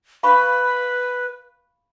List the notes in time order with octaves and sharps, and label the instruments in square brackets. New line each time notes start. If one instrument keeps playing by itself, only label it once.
[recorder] B4 [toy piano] F5 B5 C#6